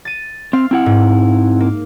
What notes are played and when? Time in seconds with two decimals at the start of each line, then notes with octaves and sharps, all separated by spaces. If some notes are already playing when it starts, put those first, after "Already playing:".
0.05 A6 D#7
0.53 C4 F5
0.71 C4 E4 F#5
0.86 G#2
1.60 A#3